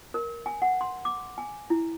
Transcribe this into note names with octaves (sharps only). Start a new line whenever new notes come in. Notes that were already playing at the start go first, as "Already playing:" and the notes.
A#4
G#5
F#5
C6
D6
G#5
E4